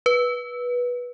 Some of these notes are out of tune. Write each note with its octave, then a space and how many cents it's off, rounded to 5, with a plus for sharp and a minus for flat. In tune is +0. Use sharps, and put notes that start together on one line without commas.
B4 -15